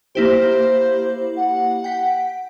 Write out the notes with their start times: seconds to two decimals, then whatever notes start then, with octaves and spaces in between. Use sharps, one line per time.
0.15 A#3 E4 G4 C5
1.37 F#5
1.84 G5 B6